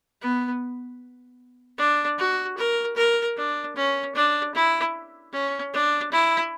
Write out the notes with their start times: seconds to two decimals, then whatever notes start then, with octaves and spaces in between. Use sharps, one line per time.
0.22 B3
1.78 D4
2.18 F#4
2.57 A#4
2.97 A#4
3.37 D4
3.76 C#4
4.15 D4
4.55 E4
5.33 C#4
5.74 D4
6.12 E4